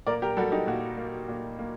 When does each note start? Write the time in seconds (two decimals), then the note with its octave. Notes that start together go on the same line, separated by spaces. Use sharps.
0.07 A#2 A#4 D5
0.22 G4 A#4
0.37 G3 F#4 A4
0.52 D#4 G4
0.67 A#2 F#4
0.98 A#3
1.28 A#2
1.59 A#3